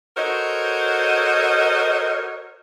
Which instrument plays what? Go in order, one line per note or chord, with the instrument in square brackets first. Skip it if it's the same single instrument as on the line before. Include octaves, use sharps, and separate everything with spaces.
[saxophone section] F#4 A4 A#4 C5 C#5 D#5